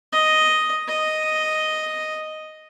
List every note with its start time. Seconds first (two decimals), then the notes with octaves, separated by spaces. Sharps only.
0.12 D#5
0.88 D#5